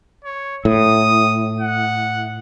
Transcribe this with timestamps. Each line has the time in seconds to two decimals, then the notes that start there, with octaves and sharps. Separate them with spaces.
0.25 C#5
0.65 A2 D#6
1.61 F#5